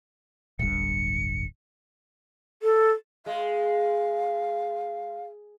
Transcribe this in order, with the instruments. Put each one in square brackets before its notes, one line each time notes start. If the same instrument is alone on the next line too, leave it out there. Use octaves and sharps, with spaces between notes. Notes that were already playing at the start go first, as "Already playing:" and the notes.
[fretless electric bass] D1 G1 G2 [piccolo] C#7
[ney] A4
[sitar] G#3 [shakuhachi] F5